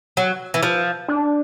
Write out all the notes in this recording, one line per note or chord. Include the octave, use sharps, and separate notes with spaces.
F#3
E3
F3
D4